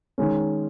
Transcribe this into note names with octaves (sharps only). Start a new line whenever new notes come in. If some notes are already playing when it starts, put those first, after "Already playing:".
D#3 G#3 C#4